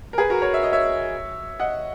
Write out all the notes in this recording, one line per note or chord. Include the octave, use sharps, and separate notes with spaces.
A#4
G#4 B4
F#4 A#4
A#4 C#5
E5
D#5
C#5 E5
D#5 F#5